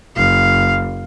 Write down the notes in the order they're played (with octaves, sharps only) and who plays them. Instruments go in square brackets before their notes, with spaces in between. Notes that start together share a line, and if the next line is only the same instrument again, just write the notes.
[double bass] F#1 [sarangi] F5